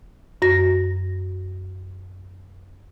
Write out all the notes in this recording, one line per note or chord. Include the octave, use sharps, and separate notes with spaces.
F#2 F#4 A#6